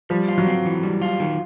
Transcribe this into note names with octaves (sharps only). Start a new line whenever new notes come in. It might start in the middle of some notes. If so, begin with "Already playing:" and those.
F3 G3
F4
F#3
C4
E3
G3
F4
D#3